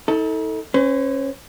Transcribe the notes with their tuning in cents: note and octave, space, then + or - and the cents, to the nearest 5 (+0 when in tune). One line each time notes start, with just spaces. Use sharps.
D#4 +45 A4 +10
C#4 -20 B4 +45